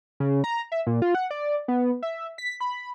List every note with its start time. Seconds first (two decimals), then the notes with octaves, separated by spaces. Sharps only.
0.20 C#3
0.44 A#5
0.72 E5
0.87 A#2
1.02 F4
1.15 F#5
1.31 D5
1.68 B3
2.03 E5
2.38 B6
2.60 B5